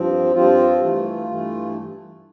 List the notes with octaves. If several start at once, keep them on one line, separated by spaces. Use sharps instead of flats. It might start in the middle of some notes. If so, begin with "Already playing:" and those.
Already playing: G2 F3 C4
G2 F3 C4 F4
G2 E3 A3
G2 E3 A3